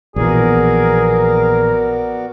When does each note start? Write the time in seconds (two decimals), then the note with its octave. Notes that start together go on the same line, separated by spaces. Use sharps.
0.16 A#1 B2 E3 B3 F#4 G#4 A#4 D5